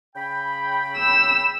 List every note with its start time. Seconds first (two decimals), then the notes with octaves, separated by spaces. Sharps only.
0.16 C#3 G5 B5
0.97 E6